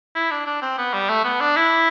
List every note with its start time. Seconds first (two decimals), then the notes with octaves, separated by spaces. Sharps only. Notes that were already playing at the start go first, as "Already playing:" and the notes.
0.15 E4
0.31 D4
0.46 D4
0.62 C4
0.78 B3
0.93 G3
1.09 A3
1.24 B3
1.40 D4
1.56 E4